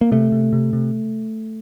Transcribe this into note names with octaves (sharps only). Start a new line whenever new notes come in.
A#3
C3 A3
C3
C3
C3